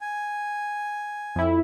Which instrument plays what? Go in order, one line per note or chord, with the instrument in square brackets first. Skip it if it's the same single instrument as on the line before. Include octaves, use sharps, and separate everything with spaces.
[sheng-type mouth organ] G#5
[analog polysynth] F2 E4